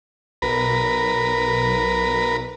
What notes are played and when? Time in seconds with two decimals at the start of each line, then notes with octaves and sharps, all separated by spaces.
0.42 B1 A#4 B4